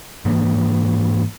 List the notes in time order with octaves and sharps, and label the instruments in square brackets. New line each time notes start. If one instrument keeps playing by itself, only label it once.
[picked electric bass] G#2 E3 A#3